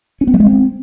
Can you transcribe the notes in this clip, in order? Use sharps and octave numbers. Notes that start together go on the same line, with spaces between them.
C#4
B3
G3
G#3
C4